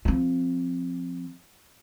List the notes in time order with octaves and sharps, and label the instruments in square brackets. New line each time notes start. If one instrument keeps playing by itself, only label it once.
[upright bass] F3 C4